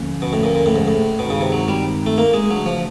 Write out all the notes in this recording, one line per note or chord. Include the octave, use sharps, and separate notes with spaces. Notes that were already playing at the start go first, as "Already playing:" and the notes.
Already playing: D#2 D3 F3 A#3 C#4
B2
A2
A#2
A#2
A2
G#2
A2
G2 B2 D#3 G#3 C4 D#4
C#3
C3
F#3
G3
A3
A#3
G#3
C#3 E3 F#3 A3 D4
F3